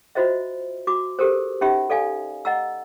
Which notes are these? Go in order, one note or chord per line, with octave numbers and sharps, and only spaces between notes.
F4 F#4 C5 D#5 E5
F#4 D6
G4 A4 A#4 C5
C#4 D#4 G4 E5 B5
A4 D5 F5 G#5
D#5 F#5 A#5 E6